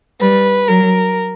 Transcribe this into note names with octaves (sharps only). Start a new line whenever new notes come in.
G3 B4
F#3 A#4